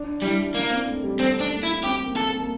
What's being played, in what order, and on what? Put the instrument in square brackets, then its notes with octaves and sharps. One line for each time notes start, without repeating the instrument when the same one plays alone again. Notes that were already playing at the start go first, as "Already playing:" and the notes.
Already playing: [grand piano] D4
[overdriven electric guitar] G3 [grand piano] E4
[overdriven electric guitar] A#3 [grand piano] D4
[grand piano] C4
A3
G3
[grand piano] A3 [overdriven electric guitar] C4
[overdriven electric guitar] D4
[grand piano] A#3
[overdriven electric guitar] E4
[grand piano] C4 [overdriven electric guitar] G4
[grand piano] A#3
[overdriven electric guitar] A4
[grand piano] A#3
A#3